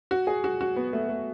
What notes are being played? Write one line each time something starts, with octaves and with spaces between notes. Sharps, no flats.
F#4
G#4
F#4
F#4
B3
A3
A3